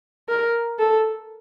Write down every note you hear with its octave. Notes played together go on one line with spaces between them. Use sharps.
A#4
A4